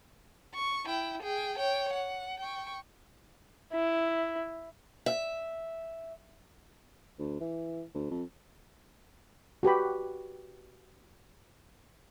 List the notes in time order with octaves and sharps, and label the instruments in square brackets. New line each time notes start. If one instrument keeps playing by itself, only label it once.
[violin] C#6
E4 G5
G#4 G5
C#5 G5
F#5
G5 C#6
[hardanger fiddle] E4
[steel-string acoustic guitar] E5
[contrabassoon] D2
E3
D2
F2
[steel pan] F#4 G4 B4 B5